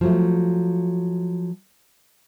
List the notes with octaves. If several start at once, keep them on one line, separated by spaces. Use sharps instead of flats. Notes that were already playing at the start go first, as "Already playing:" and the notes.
F3 F#3 A3